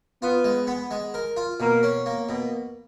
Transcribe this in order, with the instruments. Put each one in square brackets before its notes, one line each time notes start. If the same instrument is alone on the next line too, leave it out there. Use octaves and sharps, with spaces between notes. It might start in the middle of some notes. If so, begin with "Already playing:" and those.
[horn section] B3 [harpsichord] F4
[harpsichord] G#3
B3
G#3
A#4
F4
[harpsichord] B2 [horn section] A#3
[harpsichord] C#4
A#3
B2